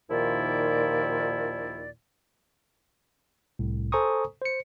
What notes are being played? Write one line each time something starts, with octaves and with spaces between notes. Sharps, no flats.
D#2 A#2 D#3 F3 E4 D5
C2 A2
A4 C5 G#5 A#5 C#6 D#6
C5 C#7